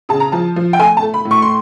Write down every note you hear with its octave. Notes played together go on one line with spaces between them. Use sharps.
C#3 A5
A#5
F3 A5
F3
G5
A3 G#5
A5
A3
B5
A2
C#6
C6